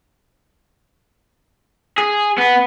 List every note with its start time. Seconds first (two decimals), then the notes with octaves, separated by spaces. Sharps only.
1.98 G#4
2.38 B3